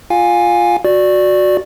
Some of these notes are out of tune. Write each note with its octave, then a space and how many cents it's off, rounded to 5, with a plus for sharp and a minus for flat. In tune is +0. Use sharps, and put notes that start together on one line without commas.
F4 +0 F5 +20 G#5 -10
F#4 -15 D5 +0